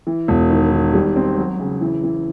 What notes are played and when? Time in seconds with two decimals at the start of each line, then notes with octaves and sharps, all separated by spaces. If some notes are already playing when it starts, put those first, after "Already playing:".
0.07 E3
0.28 E1
0.50 D#3
0.72 D#3
0.94 G3
1.16 C4
1.38 F#3
1.59 C#3
1.81 E3
2.03 E3